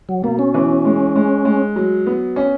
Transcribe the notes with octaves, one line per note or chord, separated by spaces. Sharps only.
F#3
B2 A#3
C#4
E3
G#3
G#3
G#3
F#3
B3
C#4